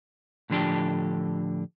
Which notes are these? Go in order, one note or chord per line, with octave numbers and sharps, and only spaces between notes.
A2 D3 F3 D4 G4 A4